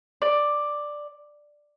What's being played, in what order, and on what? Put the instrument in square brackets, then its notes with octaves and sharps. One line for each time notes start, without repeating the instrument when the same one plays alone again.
[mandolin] D5